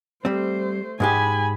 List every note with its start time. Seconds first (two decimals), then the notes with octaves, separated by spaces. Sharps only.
0.25 G3 A3 C4 C5
1.00 G#2 G#3 G4 G#5 B5